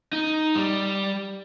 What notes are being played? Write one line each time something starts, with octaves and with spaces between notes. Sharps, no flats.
D#4
G3